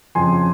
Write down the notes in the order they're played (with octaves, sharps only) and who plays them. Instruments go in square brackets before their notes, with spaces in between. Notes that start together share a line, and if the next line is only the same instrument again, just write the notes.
[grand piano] F2 C#3 F3 G#5 C6